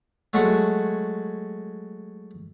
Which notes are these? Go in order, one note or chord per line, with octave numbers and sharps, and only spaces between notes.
F#3 G#3 A3 F#4 C#5 F#5